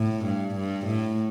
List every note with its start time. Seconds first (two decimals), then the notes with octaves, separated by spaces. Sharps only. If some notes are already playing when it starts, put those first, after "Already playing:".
Already playing: A2
0.25 G2
0.55 G2
0.86 A2